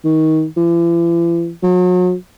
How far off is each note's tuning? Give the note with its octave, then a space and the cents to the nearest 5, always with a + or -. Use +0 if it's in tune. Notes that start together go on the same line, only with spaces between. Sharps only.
D#3 +20
E3 +45
F#3 -35